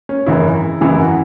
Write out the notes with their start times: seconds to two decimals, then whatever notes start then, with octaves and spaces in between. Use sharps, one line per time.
0.09 C#4
0.26 G#1 F#2 C#3 E3 E4
0.81 G#1 F#2 C#3 E3 E4
1.00 F#4